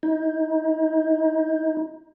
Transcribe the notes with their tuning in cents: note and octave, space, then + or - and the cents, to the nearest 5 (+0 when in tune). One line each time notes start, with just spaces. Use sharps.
D#4 +30